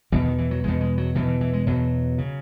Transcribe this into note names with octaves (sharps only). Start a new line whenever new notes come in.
E2 B2 E3
D#3
E3
F#3
E2 B2 G#3
G#3
F#3
E2 B2 E3
E3
E3
G#3
E2 B2 F#3
C#3